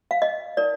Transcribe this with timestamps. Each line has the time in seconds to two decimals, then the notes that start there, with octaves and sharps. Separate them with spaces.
0.11 F5
0.22 D#5
0.57 D#4 A#4 D5